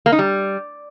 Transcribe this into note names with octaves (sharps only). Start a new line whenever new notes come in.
A#3
D#4
G3